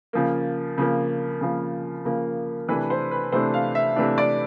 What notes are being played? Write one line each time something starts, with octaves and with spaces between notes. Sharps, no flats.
C#3 F3 A#3
C#3 F3 A#3
C#3 F3 A#3
C#3 F3 A#3
C3 E3 A3 D4 B4
C5
B4
C3 E3 A3 D4 C5
F5
E5
C3 E3 A3 D4
D5